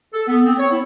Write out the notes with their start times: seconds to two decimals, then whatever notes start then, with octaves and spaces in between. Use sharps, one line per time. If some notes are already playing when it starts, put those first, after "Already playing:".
0.13 A4
0.28 B3
0.45 C4
0.58 C#5
0.71 E4